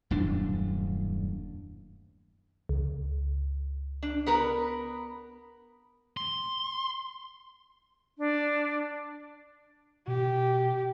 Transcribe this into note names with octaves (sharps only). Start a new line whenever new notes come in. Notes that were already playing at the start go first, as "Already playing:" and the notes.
D#1 F#2 A2 D4
C#2
D4
B3 A#4 B4
C6
D4
B2 G4